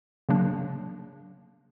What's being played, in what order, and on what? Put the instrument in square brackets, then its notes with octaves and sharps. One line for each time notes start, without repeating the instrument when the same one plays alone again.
[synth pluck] C#3 F#3 A#3 D4